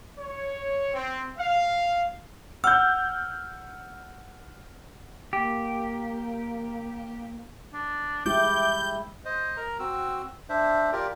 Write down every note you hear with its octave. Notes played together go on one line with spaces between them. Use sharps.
C#5
C4
F5
F#5 E6 F6 G6
A#3 G4
D4
G#3 E4 G4 D6 G6
C5 D#5
A#4 A#5
C4 F#4 E6
D4 C5 E5
F4 G4 A#4 D5